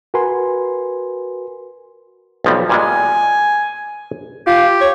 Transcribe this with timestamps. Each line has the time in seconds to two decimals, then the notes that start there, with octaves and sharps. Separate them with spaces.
0.14 F#4 A#4 B4 G#5 C6
2.44 B1 F3 G3
2.69 A#2 G3 G#3 G#5
4.47 F4 G4
4.81 C#5